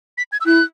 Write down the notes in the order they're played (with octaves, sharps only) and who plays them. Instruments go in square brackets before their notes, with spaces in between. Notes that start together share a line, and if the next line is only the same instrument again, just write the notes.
[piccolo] B6
G#6
E6
[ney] E4 [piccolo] F#6